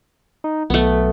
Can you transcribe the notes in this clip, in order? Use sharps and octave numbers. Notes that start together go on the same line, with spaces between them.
D#4
B1 A3 B3